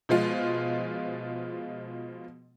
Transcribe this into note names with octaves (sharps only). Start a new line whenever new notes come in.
B2 F3 G#3 F4